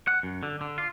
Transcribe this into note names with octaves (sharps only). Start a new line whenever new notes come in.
F#5
F#2
D3
D3
F4